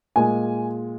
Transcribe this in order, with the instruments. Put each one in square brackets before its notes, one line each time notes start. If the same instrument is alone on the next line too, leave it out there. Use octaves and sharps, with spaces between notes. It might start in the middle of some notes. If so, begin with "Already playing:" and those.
[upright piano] A#2 G#3 G#5